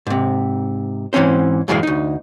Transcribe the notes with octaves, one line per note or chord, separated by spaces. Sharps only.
G#2 C3
G#2 E3 C4 C#4 C5
F#2 A2 E3 G#3 C5 F5
D2 D#4